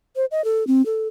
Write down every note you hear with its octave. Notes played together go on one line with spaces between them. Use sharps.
C5
D#5
A4
C4
A4